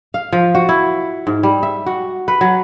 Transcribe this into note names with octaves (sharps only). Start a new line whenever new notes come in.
F5
F3
F#4
E4
G#2
G3
E5
F#4
B4
F#3